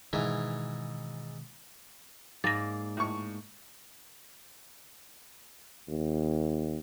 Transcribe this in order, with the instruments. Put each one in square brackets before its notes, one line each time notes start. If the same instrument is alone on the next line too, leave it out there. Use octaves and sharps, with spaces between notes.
[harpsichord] G#2 E3 [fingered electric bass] B2 D#3
[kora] G#2 A#3 D5 [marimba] A6 A#6
[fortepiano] A2 C#6
[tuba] D#2